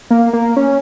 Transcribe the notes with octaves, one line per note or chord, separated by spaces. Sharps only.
A#3
A#3
C#4